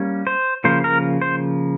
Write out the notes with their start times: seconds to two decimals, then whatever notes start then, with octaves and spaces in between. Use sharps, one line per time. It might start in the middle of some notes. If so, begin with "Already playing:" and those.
Already playing: G3 A#3 C#4
0.27 C5
0.64 C#3 F3 A#3 C5
0.84 A#4
1.22 C5